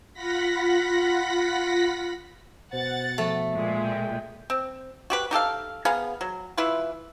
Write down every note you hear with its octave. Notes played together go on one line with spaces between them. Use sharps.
F4 F#5 B5 A#6 B6
B2 C5 F#5 A6
F3 A3
A#2 G#3
B2 G5
C4
F#4 G4 B4
D#4 G4 A4 F5
B3 G#4 F5 A#5
F#3
E3 E4 F4 B4